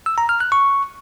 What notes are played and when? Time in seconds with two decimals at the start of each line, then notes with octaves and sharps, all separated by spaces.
0.06 E6
0.18 A#5
0.29 F6
0.40 F#6
0.52 C#6